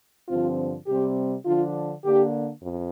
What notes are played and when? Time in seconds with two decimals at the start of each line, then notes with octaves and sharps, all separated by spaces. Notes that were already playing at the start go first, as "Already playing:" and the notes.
0.28 G2 D3 F3 C4 F4
0.87 C3 G3 C4 G4
1.45 D3 F3 D4 F4
2.04 D3 A#3 D4 G4
2.61 F2